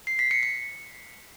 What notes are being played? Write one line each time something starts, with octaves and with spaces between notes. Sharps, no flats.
C7
B6
C#7
C#7